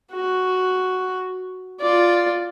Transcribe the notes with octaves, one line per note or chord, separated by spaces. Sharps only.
F#4
F4 D5